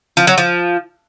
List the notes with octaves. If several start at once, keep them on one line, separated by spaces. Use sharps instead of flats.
F3
F#3
F3